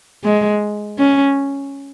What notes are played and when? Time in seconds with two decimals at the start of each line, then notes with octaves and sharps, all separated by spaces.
0.24 G#3
0.98 C#4